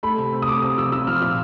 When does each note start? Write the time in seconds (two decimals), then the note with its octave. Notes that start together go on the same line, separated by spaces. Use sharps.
0.03 A3 B5
0.18 C3
0.32 C4
0.42 D#6
0.48 A3 D6
0.62 C3 D#6
0.78 F3 E6
0.92 F3 E6
1.07 F3 F6
1.22 A#2 E6